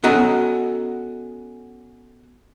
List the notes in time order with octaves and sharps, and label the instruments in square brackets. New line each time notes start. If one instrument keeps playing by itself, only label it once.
[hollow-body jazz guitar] B3 C#4 F#4 A4 D#5 A#5